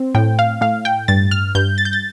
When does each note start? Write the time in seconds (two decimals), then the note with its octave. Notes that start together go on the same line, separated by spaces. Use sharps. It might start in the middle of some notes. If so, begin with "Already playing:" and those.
Already playing: C4
0.15 A2 G5
0.39 F5
0.61 A2 F5
0.85 G5
1.08 G2 A6
1.31 F6
1.55 G2 G6
1.78 A6
1.85 G6
1.93 A6